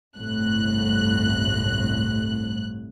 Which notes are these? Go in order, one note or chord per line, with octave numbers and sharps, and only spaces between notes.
G1 C2 A2 F#6